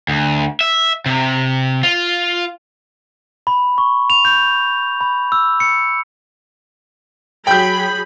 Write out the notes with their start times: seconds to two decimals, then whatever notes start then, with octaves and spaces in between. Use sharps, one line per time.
0.08 D2
0.61 E5
1.06 C3
1.83 F4
3.47 B5
3.78 C#6
4.10 F7
4.25 G6
5.01 B5
5.32 E6
5.60 C#7
7.47 F#3 G#4 G5 B5 G6